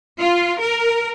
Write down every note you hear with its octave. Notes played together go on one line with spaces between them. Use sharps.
F4
A#4